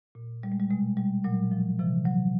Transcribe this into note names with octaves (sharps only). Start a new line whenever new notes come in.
A#2
G3
G#3
G3
B2 G#3
G3
A#2 F#3
F3
C3 E3 F3
F#3